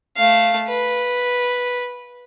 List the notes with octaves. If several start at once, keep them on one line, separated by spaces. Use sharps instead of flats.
A3 F5
B4